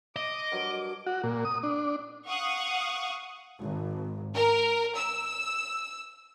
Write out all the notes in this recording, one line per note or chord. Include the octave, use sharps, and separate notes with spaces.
D#5 D6
G2 F#3 A#4
F#4
A#2
D#6
D4
F5 F#5 C#6 D#6
G#1
A#4
E6